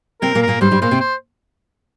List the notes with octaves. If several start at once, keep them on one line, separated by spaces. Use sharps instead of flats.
C3 C4 A#4
A#2 A#3
A#4
A#2 A#3
G2 G3 C5
G2 G3
A#2 A#3 C5
C3 C4
C5